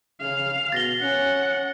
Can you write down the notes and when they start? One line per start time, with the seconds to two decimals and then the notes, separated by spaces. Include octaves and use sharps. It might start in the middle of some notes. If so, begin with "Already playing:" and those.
0.21 C#3 F5
0.72 B2 A6 A#6 G7
1.01 C#4 F#5